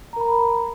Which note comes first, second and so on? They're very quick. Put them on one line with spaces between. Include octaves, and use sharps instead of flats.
A#5 A#4 B5